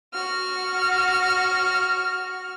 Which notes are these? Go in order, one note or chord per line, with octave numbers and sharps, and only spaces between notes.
F#4 F6